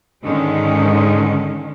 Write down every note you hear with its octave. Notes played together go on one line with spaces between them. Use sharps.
G#2 D3 D#3 G#3 C#4